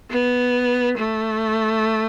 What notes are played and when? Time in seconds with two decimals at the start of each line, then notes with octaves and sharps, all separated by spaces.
0.10 B3
0.97 A3